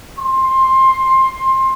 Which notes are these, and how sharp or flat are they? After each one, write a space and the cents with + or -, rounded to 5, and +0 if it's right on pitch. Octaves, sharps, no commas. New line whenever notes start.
C6 +20